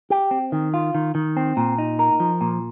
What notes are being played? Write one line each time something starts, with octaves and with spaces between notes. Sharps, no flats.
G4
C4
D#3
F4
D#3
D#3
C4
A#2
D#4
A#4
F3
A#2